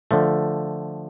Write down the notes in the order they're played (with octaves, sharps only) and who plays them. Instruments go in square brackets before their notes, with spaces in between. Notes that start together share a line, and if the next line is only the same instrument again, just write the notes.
[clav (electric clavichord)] D3 F3 A3